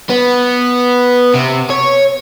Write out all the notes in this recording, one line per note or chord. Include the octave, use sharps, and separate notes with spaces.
B3
C3
C#5